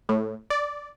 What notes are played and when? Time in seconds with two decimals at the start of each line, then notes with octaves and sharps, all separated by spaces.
0.09 A2
0.50 D5